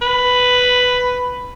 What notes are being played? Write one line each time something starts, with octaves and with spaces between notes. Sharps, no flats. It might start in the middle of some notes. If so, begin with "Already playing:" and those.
B4